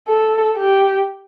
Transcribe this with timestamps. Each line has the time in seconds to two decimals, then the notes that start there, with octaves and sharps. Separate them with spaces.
0.08 A4
0.58 G4